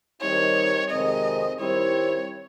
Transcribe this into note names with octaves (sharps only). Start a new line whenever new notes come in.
D#3 G3 C4 D#4 C#5
F2 C3 D#3 G#3 C4 D#5
D#3 G3 C4 E4 C#5